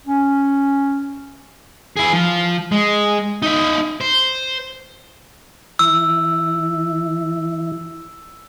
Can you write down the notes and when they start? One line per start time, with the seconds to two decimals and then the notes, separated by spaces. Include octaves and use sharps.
0.07 C#4
1.97 E4 G#4
2.13 F3
2.72 G#3
3.42 D#4 E5
4.01 C5
5.79 E3 E4 E6